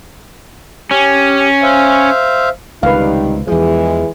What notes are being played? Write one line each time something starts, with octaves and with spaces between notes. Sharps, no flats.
C#4 G4
C5 E5 F5
C#2 C3 D#3 G3 D#4 B4 F5
E2 E3 F3 G#3 G#4